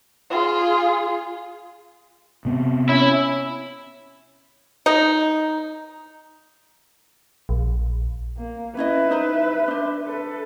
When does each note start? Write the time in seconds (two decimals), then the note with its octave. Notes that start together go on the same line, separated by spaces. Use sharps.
0.30 F4 G#4
2.45 C3 B3 C4
2.89 C#4 E4
4.86 D#4
7.49 A#1
8.37 A#3
8.77 C#4 E4 B4 D#5 E5
9.11 D#4 C5 B5
9.68 D4 C5
10.06 A4 B4